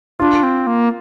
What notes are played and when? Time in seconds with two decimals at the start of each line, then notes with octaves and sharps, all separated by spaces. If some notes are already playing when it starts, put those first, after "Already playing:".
0.20 D4 F4
0.43 C4
0.67 A#3